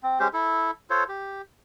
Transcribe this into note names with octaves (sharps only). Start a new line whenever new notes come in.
C4
G#3 C#4 G4 C5
E4 A4
F4 A4 C5 C#5
G4